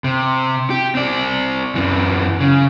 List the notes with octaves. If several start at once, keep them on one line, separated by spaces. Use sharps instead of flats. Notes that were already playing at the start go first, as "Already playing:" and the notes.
C3
G4
C4 D5
F#2 E3
C#3